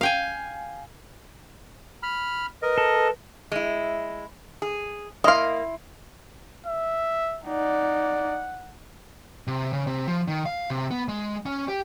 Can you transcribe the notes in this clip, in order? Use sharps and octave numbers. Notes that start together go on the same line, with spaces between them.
F5 G5 G#5
B5 F6
A#4 B4 D#5
A4
G#3 E4
G#4
A#3 E4 D#5 F5 C6
E5
D#4 D5 F#5
C3
C#3
C3
F3
D#3
F5
C3
B3
G#3
C#4
G4